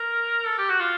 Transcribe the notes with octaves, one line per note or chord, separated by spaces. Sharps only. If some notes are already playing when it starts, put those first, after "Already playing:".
Already playing: A#4
A4
G4
F#4
F4